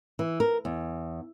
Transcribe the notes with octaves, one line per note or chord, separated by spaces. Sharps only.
E3
A#4
E2